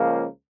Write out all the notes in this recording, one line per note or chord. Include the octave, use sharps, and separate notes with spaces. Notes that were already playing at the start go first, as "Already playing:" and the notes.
Already playing: C#2 C#3 F3 A#3